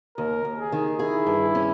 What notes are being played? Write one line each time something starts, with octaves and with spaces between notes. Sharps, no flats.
D#2 A#4
D#2
G#4
D#3
E4 G#4
G2
C#4